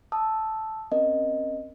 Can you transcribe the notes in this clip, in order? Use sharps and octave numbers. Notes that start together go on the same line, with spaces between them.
A5 D#6 E6
C4 C#4 A#4 D#5